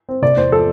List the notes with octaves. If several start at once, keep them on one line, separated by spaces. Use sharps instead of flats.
C4
C3 D5
E2 C5
F3 A4